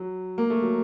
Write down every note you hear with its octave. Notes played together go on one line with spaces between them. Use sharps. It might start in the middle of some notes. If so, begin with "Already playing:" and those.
Already playing: F#3
A#3
A3
F#3